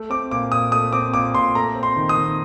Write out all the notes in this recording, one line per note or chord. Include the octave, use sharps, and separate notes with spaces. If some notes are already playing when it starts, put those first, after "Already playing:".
Already playing: A3
C4 D6
A#2 D6
A#2 D#6
A3 D#6
C4 D6
A#2 D6
A#2 C6
A3 A#5
C4
C6
D#3
D#6
D#3